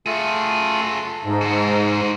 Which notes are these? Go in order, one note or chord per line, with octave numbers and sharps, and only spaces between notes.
A3 F4 F#4 G#4 A4
A4
G#2
F#4 C5